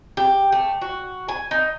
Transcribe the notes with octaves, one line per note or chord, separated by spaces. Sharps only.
G4
A3
F#4
G#5
D#4